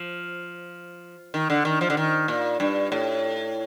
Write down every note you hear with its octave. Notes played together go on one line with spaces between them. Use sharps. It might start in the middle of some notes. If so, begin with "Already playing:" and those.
Already playing: F3
D#3
D3
D#3
F3
D3
D#3
A#2
G2
A2